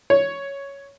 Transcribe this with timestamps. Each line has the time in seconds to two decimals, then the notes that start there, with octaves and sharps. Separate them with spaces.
0.10 C#5